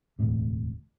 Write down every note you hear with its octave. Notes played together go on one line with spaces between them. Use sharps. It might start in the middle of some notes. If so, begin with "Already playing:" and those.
E1 D2 A2 C3